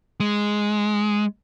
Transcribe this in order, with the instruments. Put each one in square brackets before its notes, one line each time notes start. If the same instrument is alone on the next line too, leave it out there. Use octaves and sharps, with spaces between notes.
[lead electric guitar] G#3